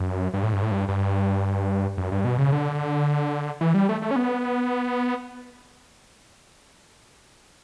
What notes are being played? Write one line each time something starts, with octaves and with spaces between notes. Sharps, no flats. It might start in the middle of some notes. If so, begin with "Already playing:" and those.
Already playing: F#2
G2
A2
G2
A2
G2
G2
F#2
G2
B2
C#3
D3
E3
G3
A3
A3
C#4
B3